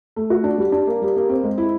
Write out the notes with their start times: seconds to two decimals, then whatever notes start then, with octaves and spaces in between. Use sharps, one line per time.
0.16 A3
0.30 F#4
0.44 D4
0.58 G3
0.72 D4
0.87 A#3
1.02 G3
1.16 A#3
1.29 C4
1.44 G#3
1.58 E4